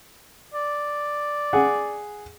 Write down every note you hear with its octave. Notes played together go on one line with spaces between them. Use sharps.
D5
G#4 F#5